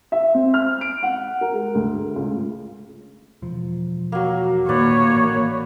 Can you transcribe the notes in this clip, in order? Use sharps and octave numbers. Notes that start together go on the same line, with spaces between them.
E5
C4
F6
D7
F#5
A#4
G#3
D2
C#2
E1 F3
F#3 A#3
A#2 D#3 A#3 B4 C#5 D5
A1